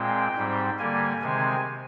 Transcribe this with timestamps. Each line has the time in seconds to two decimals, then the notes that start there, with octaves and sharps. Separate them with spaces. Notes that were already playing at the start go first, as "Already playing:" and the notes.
Already playing: A#2 G#3 C4 G5
0.36 G#2 G3 C4
0.79 D3 G3 A#3 G#5
1.22 C3 D#3 G#3 C4 G#5